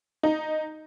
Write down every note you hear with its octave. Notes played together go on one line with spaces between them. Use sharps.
D#4